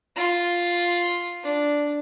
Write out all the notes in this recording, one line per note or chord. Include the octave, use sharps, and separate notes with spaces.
F4
D4